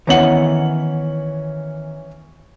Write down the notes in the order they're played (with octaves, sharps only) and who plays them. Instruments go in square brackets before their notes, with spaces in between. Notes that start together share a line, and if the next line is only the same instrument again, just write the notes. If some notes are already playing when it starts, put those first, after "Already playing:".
[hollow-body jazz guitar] D#3 B3 F#5 [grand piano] E3 C#4 F#7